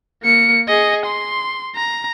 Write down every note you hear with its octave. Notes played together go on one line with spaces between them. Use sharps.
A#3 C#7
G#4 D#5
C6
A#5